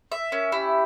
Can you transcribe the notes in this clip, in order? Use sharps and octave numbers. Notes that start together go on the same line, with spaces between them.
E5
C#4 A#4
E4 G4